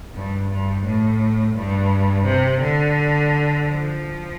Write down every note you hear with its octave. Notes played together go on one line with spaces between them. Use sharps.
G2
G2
A2
G2
C3
D3
F3